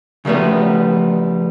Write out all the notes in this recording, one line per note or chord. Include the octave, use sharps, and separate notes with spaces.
C#3 F3 G3 A3 B3